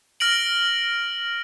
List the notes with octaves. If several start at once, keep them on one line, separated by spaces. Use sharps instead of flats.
F6 A#6 D7 F#7